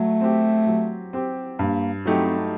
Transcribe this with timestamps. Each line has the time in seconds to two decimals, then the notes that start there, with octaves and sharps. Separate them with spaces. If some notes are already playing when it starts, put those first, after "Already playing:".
Already playing: F#3 A3
0.21 C4 G4
0.67 F#3
1.13 C4 G4
1.59 G2 A#3
2.05 F#3 A3 C4 D#4 G4